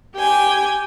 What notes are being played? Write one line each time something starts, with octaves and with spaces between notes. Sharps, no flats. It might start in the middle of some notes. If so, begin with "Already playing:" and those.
G4 G5 G#5